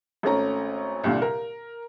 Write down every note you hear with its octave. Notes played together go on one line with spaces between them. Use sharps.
G#1 A3 C#4 A#5
C2 G2 A#2 D3
A#4